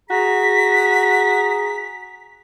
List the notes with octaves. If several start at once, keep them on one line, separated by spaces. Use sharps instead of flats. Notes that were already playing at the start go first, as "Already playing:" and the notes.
F#4 G#4 A#5 B6